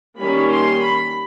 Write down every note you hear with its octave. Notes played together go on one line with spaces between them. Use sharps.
D#3 G3 A#3 C#4 B5
C6
B5